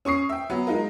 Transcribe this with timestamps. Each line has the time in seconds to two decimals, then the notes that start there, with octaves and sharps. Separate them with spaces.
0.05 C#4 C#6 D#6 C7
0.29 E5 G5
0.50 F#3 B3
0.67 G#3 D#4 F4 A#4